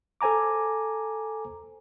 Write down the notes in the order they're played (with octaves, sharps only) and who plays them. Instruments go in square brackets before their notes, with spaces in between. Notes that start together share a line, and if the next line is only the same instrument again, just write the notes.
[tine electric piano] A4 C5 G#5 A#5 D6